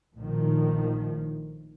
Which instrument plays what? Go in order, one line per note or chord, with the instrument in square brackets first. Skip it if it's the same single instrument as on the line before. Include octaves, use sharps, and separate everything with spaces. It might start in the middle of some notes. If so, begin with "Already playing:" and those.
[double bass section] A#1 A2 D#3 F3